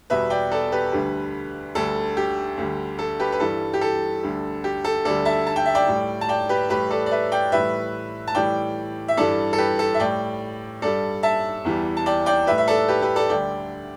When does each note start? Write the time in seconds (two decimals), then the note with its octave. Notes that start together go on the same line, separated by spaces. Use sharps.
0.10 E2 B2 G3 B4 E5
0.30 D5 G5
0.51 A4 D5
0.72 G4 B4
0.92 D2 D3 G3
1.75 D2 D3 G3 A4
2.17 G4
2.57 D2 D3 G3
2.99 A4
3.19 G4 B4
3.32 B4
3.40 G2 E3 G3 A4
3.74 G4
3.81 A4
4.23 D2 D3 G3
4.64 G4
4.84 A4
5.05 D2 D3 G3 A4 D5
5.25 E5 A5
5.47 A5
5.56 G5
5.66 E5
5.75 D5 G5
5.88 A2 G3
6.21 A5
6.29 D5 G5
6.49 G4 B4
6.70 A2 E3 G3 G4 B4
6.90 A4 D5
7.06 D5
7.11 B4 E5
7.32 D5 G5
7.52 A2 E3 G3 B4 E5
8.28 A5
8.35 A2 E3 G3 D5 G5
9.08 E5
9.17 G2 E3 G3 A4 D5
9.53 A4
9.58 G4 B4
9.79 A4
9.94 E5
10.00 A2 G3 D5 G5
10.82 G2 G3 A4 D5
11.23 E5 A5
11.65 E2 E3 G3
11.97 A5
12.06 D5 G5
12.26 D5 G5
12.47 A2 G3 B4 E5
12.58 E5
12.68 A4 D5
12.88 G4 B4
13.02 G4 B4
13.16 A4 D5
13.29 D2 D3 G3 D5 G5